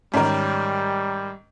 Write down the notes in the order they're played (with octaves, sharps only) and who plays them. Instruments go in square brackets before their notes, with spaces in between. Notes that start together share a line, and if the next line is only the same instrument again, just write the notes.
[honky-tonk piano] G#2 D#3 [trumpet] G3 [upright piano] C#4 A#4